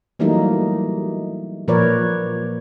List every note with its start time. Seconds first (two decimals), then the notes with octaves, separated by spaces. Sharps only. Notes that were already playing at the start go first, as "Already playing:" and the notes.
0.19 E3 F#3 G3 A3 A#3 D#4
1.68 A#2 F3 A#4 B4 C#5 D5